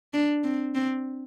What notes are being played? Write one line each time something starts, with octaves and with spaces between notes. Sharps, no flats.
D4
C4
C4